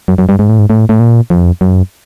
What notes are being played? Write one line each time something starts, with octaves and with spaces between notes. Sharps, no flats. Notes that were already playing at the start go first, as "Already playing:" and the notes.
F#2
F#2
G2
G#2
A2
G#2
A2
A2
A#2
F2
F#2